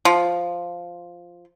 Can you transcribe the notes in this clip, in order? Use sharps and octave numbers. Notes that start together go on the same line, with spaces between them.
F3